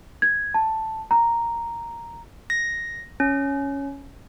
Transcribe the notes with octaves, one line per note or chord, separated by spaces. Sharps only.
G#6
A5
A#5
A#6
C#4